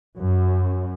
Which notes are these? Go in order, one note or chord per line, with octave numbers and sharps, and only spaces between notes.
F#2